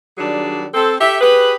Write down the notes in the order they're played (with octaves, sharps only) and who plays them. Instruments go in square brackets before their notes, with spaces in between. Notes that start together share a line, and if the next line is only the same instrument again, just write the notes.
[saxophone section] D#3 F#3 G3 D4 G#4
C4 A4
G4 A4 E5
G4 G#4 B4